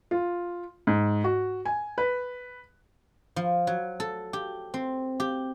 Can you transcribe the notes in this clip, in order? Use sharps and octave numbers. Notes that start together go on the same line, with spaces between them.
F4
G#2
F#4
G#5
B4
F3
F#3
A4
G4
C4
G4